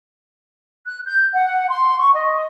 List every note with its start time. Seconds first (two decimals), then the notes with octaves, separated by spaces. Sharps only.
0.85 F#6
1.05 G6
1.34 F#5
1.70 C6
1.99 C#6
2.14 D#5